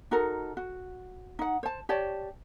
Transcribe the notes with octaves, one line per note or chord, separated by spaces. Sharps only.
D#4 F#4 A4 A#4
F#4
D#4 F#5
C5 A5
G4 C#5 D5 A5